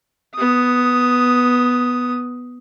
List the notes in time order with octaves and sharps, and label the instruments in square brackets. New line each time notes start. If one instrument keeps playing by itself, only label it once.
[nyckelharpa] B3 D#6